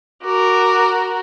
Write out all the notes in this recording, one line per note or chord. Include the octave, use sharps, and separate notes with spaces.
F#4 A#4 D6